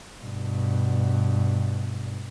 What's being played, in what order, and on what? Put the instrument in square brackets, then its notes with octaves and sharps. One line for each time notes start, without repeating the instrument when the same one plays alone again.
[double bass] G2 B2